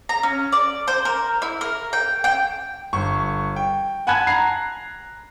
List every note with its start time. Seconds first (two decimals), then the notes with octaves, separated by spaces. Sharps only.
0.09 A#5
0.23 C#4
0.52 D5
0.88 C5
1.05 A#4
1.42 E4
1.61 A#4
1.93 G5
2.24 G5
2.93 G1 C#6
3.56 G5
4.07 F#5 G#5 A5 B5 F#6 G#6
4.27 A#5 C7